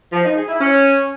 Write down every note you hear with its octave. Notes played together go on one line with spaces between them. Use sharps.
F3
D#4
G#4
E4
C#4